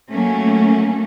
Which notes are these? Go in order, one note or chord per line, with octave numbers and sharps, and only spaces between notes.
F#3 A3 A#3 C#4